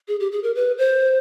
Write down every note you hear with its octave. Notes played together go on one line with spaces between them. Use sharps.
G#4
G4
G#4
A#4
B4
C5